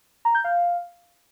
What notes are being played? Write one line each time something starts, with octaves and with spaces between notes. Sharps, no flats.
A#5
G6
F5